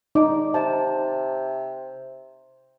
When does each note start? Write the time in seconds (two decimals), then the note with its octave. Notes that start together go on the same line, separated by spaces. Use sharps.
0.15 D#4 D5 D6
0.54 C3 A5